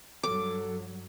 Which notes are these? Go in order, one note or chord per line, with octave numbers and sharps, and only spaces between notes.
G2 F#3 A4 D6